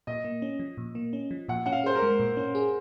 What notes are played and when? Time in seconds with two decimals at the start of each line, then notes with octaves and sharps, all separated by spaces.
0.07 A#2 D#5
0.24 A#3
0.42 C#4
0.59 F3
0.78 A#2
0.95 A#3
1.13 C#4
1.31 F3
1.48 A#2 F#5
1.66 C#4 F#5
1.72 F5
1.84 G#4 C5
1.95 A#4
2.02 G#3
2.20 A#2
2.37 C#4
2.55 G#4